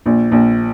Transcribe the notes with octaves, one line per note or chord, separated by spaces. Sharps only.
A#1
A#1